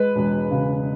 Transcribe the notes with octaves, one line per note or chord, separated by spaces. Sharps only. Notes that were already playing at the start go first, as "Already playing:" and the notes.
Already playing: G#3 B4
E1
C#3